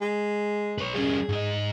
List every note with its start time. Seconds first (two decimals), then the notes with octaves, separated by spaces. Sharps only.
0.02 G#3
0.78 B4 C#5
0.94 G3 C#4 G#4
1.29 G#2 D#5